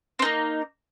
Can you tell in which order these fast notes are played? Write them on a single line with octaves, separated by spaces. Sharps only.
C4 D#4 A#3